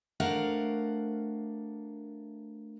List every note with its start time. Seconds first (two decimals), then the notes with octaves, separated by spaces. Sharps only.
0.20 A3 D4 A#4 C5 F5 F#5